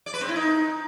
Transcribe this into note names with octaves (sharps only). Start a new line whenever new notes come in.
D5
B4
C4
E4
D#4